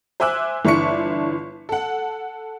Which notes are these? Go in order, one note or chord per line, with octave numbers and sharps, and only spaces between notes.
C5 E5 G#5 D6 E6 F#6
G1 E3 D4 E5 C#6 C#7
A4 F#5